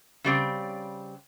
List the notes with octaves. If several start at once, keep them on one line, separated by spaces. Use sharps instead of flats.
C#3 G3 C4